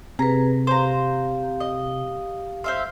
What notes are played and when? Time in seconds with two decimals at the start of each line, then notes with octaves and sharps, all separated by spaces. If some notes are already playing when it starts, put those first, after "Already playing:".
0.19 C3 G#4 B4 A#5
0.67 G4 C5 F5 A#5
1.60 D#5
2.64 C5 E5 F5 C6